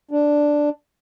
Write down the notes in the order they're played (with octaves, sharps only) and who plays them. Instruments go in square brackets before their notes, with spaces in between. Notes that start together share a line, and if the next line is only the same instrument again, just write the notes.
[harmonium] D4